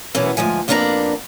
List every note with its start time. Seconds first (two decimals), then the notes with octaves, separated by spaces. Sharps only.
0.15 F#2 B2 E3 B3 C#4
0.37 D2 G#2 F3 G#5
0.68 F2 A#3 B3 D4 G#4 A#5